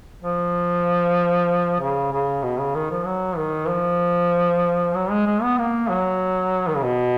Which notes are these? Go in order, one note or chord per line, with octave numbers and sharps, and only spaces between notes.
F3
C#3
C#3
B2
C#3
D#3
F3
F#3
D#3
F3
F#3
G#3
G#3
B3
A#3
F#3
D#3
C#3
B2